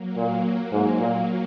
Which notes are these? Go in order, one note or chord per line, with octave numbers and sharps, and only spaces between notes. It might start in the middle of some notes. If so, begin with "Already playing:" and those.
Already playing: F#3 A#3
A#2
G#2
A#2